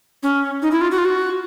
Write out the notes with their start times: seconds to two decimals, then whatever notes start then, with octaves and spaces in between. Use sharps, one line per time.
0.23 C#4
0.62 D#4
0.71 E4
0.81 F4
0.91 F#4
0.98 F4
1.05 F#4